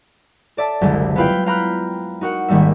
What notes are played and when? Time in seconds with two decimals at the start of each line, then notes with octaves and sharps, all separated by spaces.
0.57 A4 D5 E5 A5
0.81 F#1 C2 D3 G#3 A6
1.16 B3 E4 F4 B4 F5 G5
1.46 F5 G5 A#5 B5 F6 F#6
2.21 D#4 F#4 A#4 F#5
2.48 G#1 D#3 G3 A#3 E5